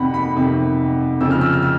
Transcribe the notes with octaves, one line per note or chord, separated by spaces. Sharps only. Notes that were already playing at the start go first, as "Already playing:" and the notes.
Already playing: F2 C3 D#3 F#5 B5
B5
F2 C3 D#3
F2 C#3 F3 E6
F6
E6
F6
E6